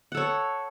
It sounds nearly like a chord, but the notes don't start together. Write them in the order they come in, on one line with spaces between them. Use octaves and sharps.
F#5 A4 C#5